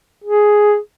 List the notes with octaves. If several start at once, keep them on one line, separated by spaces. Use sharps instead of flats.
G#4